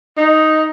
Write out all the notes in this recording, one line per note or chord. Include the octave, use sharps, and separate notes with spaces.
D#4